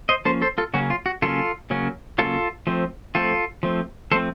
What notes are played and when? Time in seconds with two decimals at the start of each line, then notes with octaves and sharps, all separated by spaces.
0.09 C5 D#5
0.25 F3 A#3 C#4 A4 C5
0.42 A4 C5
0.58 F4 A4
0.74 C#3 F#3 A#3 C#4 F#4
0.90 F4
1.06 F#4
1.22 C#3 F#3 A#3 C#4 F4 A4
1.70 C#3 F#3 A#3 C#4
2.18 C#3 F#3 A#3 C#4 F4 A4
2.67 F3 A3 C4
3.15 F3 A3 C4 F4 A4
3.63 F3 A3 C4
4.12 F3 A3 C4 A4 C5